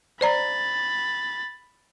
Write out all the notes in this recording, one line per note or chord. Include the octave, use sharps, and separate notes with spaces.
C5 D5 A#5 B5 A6